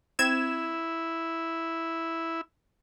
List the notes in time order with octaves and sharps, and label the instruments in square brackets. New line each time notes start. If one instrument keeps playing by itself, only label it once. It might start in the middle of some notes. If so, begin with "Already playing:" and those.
[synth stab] C4 G#6 E7 [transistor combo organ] E4